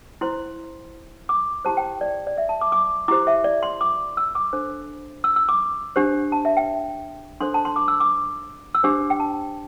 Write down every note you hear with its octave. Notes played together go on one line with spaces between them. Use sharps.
E4 C5 C6
D6
E4 G4 C5 A5
G5
D5
D5
E5
A5
D6
D6
E4 G4 C5 D6
E5
D5
C6
D6
E6
D6
D4 A4 C5
E6
E6
D6
D4 G4 C5
A5
E5
G5
D4 A4 C5 C6
A5
C6
D6
E6
D6
E6
D4 G4 C5 D6
G5
A5